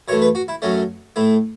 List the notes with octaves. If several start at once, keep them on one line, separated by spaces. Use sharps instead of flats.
F#2 E3 A3 C#5
B4
F#4
E4
F#2 F#3 A3 C#4
A2 A3 E4